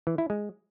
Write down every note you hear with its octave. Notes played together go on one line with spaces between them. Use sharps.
E3
E4
G#3